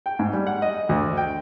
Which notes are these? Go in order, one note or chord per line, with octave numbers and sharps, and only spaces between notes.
G5
G#2
G3
F#5
D#5
D2
G5